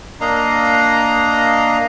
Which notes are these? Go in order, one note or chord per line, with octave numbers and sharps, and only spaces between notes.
A#3 D4 D#5 F5 A#5